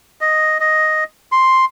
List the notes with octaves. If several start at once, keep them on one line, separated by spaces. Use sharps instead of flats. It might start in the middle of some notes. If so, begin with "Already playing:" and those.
D#5
D#5
C6